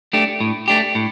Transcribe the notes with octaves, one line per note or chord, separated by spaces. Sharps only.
A3 D4 G4
A2
A3 D4 G4
A2